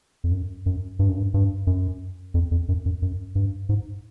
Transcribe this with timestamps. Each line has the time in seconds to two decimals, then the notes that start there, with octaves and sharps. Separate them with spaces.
0.24 F2
0.32 F#2
0.66 F#2
0.99 G2
1.09 F#2
1.17 G2
1.34 G2
1.67 F#2
2.34 F2
2.51 F2
2.69 F#2
2.86 F#2
3.02 F#2
3.35 G2
3.69 G#2